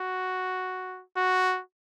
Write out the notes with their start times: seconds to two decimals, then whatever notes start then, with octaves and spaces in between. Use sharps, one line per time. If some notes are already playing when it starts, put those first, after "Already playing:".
Already playing: F#4
1.17 F#4